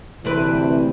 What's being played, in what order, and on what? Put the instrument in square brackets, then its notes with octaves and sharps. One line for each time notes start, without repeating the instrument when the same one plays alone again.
[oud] D2 C4 B4 [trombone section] C3 E3